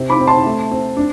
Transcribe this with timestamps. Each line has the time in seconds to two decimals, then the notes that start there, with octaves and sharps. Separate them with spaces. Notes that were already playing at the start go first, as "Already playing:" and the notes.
Already playing: C3 C4
0.10 B5 D6
0.19 C4
0.27 A5 C6
0.45 A3
0.71 C4
0.97 D4